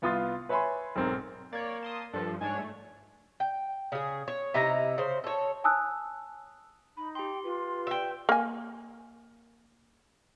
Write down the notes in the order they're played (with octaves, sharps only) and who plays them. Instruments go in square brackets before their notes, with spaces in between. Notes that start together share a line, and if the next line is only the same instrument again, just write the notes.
[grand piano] C2 B3 F4 C6 D#6 A6
B4 C#5 E5 G#5 B5 C6
B1 G#2 C4 A#4
[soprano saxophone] A#3 [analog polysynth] C#5 D5
[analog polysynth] A5 C6 D#6
[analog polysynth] G2 F3 [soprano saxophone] A4
[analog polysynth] G#2 D4 C#5 [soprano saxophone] G#5
[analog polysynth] A3
[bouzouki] G5
C#3 G#4
C#5
C3 D#4 E4 A#5
C#3 C5
A4 C#5
[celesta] G#5 A5 D#6 E6 F#6
[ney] D#4 [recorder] B5
[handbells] G4 C6 [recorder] G5
[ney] F4 [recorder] B4
[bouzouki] E5 G5
[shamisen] A#3 G#5